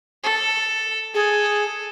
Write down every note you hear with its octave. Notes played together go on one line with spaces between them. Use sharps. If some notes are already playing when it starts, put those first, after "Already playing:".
A4
G#4 A4